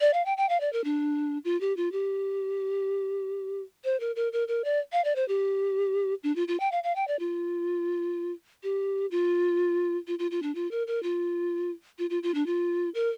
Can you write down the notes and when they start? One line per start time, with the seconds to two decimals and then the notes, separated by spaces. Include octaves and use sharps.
0.01 D5
0.14 F5
0.26 G5
0.37 G5
0.49 F5
0.60 D5
0.73 A#4
0.84 D4
1.45 F4
1.61 G4
1.77 F4
1.92 G4
3.84 C5
4.00 A#4
4.16 A#4
4.33 A#4
4.48 A#4
4.64 D5
4.92 F5
5.04 D5
5.16 C5
5.28 G4
6.23 D4
6.36 F4
6.48 F4
6.60 G5
6.72 F5
6.84 F5
6.96 G5
7.08 D5
7.19 F4
8.63 G4
9.11 F4
10.07 F4
10.19 F4
10.31 F4
10.43 D4
10.55 F4
10.71 A#4
10.87 A#4
11.03 F4
11.99 F4
12.10 F4
12.23 F4
12.34 D4
12.46 F4
12.95 A#4